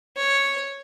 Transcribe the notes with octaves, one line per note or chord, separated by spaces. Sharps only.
C#5